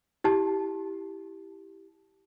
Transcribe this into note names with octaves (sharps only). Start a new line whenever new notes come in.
E4 G4 A5